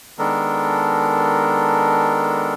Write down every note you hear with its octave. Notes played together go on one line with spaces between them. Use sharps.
D#3 G#3 B3 D4 A4 A#4